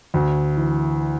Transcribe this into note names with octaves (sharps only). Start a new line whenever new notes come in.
D2
E3